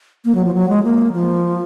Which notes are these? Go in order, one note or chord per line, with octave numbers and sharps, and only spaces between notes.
A#3
F#3
F3
F#3
G#3
A#3
F3